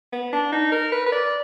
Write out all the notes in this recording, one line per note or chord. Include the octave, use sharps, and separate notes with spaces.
B3
D4
D#4
A#4
B4
B4
D5